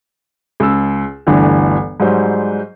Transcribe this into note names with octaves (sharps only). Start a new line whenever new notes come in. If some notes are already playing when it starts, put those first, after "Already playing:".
C#2 E6
G1 D2 D3 E3
G#2 F#3 G3 C5